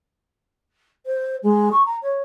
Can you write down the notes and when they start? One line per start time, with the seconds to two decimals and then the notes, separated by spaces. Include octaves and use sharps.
1.06 C5
1.43 G#3
1.72 C#6
1.85 A#5
2.02 C#5